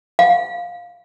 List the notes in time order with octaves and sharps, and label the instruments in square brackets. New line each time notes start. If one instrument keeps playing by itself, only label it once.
[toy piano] F5